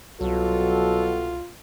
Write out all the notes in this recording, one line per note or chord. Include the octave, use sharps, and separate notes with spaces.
C2 B2 F#3 F4 F#4 A4